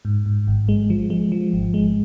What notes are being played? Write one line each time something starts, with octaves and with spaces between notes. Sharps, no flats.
G#2
G#2
G#1
G#3
F3
G#3
F3
G#1
G#3